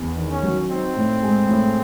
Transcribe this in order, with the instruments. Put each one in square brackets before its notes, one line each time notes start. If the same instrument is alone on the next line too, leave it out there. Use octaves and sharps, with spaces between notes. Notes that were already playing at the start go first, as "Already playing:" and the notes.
Already playing: [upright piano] E2
D#3
[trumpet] C#4
[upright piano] F#3
[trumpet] C4 [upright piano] D#4
[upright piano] A2
G#3
A2